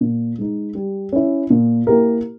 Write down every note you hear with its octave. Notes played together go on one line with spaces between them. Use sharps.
A#2
G#3 D#4
G3
C#4 E4
A#2
A#3 E4 G4 A#4